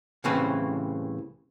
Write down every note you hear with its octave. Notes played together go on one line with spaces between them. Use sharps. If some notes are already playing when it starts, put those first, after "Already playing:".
C2 A2 C#3 E3 C4 B4